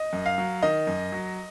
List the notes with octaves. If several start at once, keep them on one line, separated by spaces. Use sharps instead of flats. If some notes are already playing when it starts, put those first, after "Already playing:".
Already playing: D#5
F#2
F5
F#3
D#3 D#5
F#2
F#3